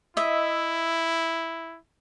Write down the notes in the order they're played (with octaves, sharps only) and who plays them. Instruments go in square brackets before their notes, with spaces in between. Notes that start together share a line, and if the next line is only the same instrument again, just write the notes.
[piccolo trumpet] E4 [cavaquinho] D#5 E5